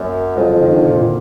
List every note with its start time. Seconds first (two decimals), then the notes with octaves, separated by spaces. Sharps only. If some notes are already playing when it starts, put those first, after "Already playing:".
Already playing: F#2 A#3
0.36 F2 G#3
0.48 F3
0.61 D#3
0.73 D3
0.84 A#2
0.96 A#2